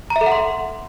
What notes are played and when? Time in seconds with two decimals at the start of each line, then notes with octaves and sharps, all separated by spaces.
0.10 A#5
0.16 E5
0.21 A4
0.26 F#5
0.32 C6